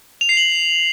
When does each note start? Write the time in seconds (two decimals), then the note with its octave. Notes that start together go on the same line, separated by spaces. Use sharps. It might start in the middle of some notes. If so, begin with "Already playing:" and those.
0.21 F7
0.29 C7
0.37 F#7